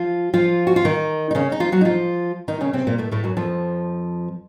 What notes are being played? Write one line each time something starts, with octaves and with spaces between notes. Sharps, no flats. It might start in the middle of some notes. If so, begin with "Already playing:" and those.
Already playing: F3 F4
F3 F4
F#4
F4
D#3 D#4
D#4
C#3 C#4
D#4
F3 F4
F#3 F#4
D#4
F3 F4
D#3 D#4
C#3 C#4
C3 C4
A#2 A#3
A2 A3
A2 A3
F#2 F#3
F2 F3